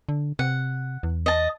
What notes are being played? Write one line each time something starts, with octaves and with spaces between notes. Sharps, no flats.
D3
C3 F#5
E2
D#5 A5